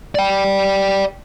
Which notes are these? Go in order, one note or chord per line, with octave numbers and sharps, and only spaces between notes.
D5 G5